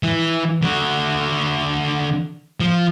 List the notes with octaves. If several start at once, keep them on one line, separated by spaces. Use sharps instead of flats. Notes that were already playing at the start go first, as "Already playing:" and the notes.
E3
D3 F#4
F3